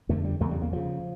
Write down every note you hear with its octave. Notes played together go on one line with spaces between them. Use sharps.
F2 D3 A3
G3
E2 C#3 A3
G3
A#3
D2 C#3 F3